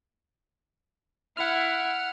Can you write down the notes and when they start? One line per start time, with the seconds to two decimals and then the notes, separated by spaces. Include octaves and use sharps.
1.37 E4 F#5 F6